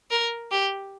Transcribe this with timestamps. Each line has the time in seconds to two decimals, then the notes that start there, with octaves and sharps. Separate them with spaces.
0.11 A#4
0.51 G4